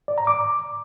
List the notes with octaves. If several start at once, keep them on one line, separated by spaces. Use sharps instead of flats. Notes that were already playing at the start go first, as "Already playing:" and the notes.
D5
A#5
D6